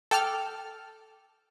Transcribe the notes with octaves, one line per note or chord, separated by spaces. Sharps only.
A4 G5 D6 F6